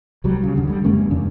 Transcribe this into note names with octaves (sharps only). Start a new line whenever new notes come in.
C2 F#3 G3
C#3
D2 G2 D3
D3 G3
F#2 G#3 A#3 C#4
E2 G2 C#3 D4